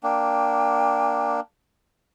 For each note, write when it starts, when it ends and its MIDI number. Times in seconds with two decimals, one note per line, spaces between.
0.03 1.40 58
0.03 1.40 62
0.03 1.37 79